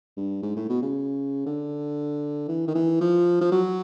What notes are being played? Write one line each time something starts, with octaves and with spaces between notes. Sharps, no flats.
G2
G#2
A2
B2
C#3
D3
E3
D#3
E3
F3
F3
F#3